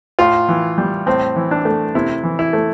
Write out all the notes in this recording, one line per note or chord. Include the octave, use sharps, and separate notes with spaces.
A2 F4
E3
G3
A2 C4
E3
D4
A3
C3 E4
E3
E4
A3